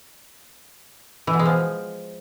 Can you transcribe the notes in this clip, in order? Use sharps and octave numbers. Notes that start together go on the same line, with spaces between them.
E3
B2
G#3
F3